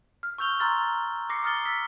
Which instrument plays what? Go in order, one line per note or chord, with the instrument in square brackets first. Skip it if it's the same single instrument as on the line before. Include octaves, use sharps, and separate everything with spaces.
[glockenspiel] F6
C#6 E6 G6 F7 G7
A#5 C6 E6 F6 A6
D6 A#6 C7 C#7
A#5 D#6 F6 A6 G7
E6 B6